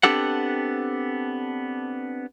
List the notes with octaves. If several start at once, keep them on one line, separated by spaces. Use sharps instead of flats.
B3 C4 D4 G4 A4 F#5